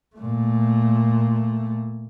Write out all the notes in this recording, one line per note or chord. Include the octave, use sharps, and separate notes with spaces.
A#2 A3